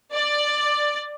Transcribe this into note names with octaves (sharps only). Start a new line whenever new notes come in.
D5